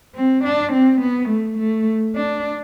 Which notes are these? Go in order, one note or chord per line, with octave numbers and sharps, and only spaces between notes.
C4
D4
C4
B3
A3
A3
D4